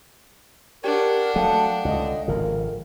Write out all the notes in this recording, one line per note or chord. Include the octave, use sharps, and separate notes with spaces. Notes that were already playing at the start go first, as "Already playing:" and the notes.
D4 G4 A#4 F#5 G5 G#6
F#3 A3 A4 F5 G5 A5
C#2 D3 D#5
G#1 C#3 F3 A#4